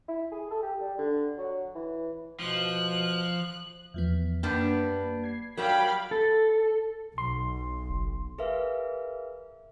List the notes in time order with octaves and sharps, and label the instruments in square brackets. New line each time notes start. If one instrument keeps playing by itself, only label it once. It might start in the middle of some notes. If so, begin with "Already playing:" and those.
[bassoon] E4
G#4
A4
G4
G3
D3
F#3
E3
[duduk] B2 [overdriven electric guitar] F3 [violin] F#6
[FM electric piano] E2 F3 B3
[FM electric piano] F#2 A#3 [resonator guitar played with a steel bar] G3 B3 D4
[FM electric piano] G#6 C7
[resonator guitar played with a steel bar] F#3 G3 [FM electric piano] A#4 [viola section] F5 G5 B5
[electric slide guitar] A4
[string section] B1 [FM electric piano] C6
[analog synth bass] F#1
[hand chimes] G#4 A#4 B4 E5 F5